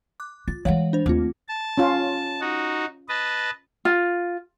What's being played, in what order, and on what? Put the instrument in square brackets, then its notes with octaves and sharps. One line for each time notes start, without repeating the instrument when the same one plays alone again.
[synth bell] D6 F#6
[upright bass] F4 [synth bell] A6
[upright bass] E3 G#3 [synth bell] C#5 F5 F#5
[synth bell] D4 C5
[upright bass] D#2 [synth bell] A3 C4 F4
[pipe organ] A5
[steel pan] C#4 F4
[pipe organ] D#4 F#4
B4 D#5 A5
[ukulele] F4